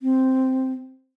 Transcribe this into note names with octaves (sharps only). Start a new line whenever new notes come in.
C4